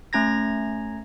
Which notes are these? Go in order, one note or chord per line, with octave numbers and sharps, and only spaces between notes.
A3 C#4 A#5 G#6 A#6